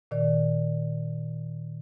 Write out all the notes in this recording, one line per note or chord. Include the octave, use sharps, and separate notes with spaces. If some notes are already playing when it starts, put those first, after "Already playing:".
A#2 D#3 D5